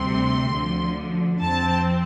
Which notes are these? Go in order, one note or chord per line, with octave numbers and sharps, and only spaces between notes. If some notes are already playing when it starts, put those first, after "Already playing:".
Already playing: D2 C3 G3 C4 C6
D2 D3 F3
F2 F3 C4 A5